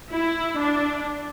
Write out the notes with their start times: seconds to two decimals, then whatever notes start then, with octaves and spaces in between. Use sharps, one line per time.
0.13 E4
0.59 D4